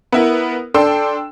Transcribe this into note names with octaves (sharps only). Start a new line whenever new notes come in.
B3 E4 A#4
D4 A4 G5 C6 E6